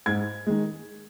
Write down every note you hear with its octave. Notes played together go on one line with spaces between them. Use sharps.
G#2 G#6
D#3 G#3